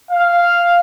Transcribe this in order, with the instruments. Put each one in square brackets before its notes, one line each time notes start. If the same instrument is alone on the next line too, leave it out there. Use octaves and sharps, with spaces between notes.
[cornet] F5